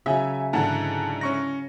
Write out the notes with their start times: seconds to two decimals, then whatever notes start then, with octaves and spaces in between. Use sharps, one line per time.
0.06 C#3 F#3 E5 G#5
0.53 G#2 D3 E3 F#5 G#5 A5
1.21 C#4 C#6 A#6